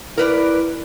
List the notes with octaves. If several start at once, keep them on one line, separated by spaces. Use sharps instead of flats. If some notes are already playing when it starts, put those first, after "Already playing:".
E4 A#4 B4 D5